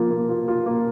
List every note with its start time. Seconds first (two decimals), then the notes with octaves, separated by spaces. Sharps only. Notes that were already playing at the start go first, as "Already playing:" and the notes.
Already playing: F3 A#3 F4
0.11 A#3
0.29 F4
0.48 F4
0.66 A#3